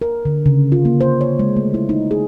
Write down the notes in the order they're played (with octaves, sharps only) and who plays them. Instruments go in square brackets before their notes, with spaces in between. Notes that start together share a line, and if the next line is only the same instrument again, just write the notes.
[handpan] A#4
D3
C#3
F4
A#3
C5
C#5
G#3
A3
E4
D#4
G#4